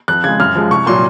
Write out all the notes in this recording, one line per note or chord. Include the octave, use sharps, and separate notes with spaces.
F2 F#6
C#3 G#3 G#6
F#2 F6
F3 G#3
C2 C#6
A#2 F#3 C6